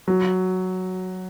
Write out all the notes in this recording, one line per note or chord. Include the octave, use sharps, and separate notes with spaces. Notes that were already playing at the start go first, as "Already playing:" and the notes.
F#3